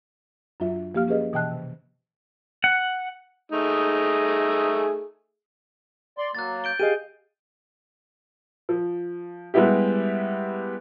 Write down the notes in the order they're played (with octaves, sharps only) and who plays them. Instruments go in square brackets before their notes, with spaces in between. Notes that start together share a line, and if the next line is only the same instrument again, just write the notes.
[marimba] F#2 F#3 D4 F4 E5
F3 A#3 G4 F5 F6
C#4 G4 G#4 B4 D#5
B2 E3 D#5 G5 A5 F#6
C3
[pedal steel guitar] F#5
[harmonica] A3 D#4 G#4
[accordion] D5 C6
[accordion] F#3 A#3 [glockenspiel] F#6 A6
[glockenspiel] G6 D7 G7
[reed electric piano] G4 G#4 D#5 [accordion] F5 [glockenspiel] D#7
[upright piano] F3
G3 G#3 B3 E4 G4